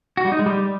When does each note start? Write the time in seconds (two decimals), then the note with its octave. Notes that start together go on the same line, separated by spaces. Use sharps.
0.17 F#4
0.25 G3
0.32 D#4
0.39 G#3
0.46 G3